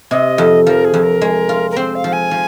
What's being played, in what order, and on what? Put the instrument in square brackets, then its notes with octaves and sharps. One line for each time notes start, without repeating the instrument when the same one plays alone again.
[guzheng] C3 [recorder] D#5
[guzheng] F2
[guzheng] F3 [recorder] A#4
[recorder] G#4
[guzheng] F2
[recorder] A#4
[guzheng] G#3
F4
[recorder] A#4
[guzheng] C4 [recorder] C5
[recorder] F5
[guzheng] F3
[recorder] G#5
[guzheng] F3